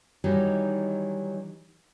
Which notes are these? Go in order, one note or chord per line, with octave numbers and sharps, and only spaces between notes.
D#3 E3 F#3 G3 D#4